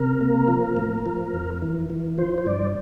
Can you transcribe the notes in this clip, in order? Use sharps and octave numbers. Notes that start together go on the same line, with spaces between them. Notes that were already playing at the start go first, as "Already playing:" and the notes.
Already playing: C3 A#4
A#3
F3
A2
F3
F2
E3
E3
F3 C5
C5
G2 D5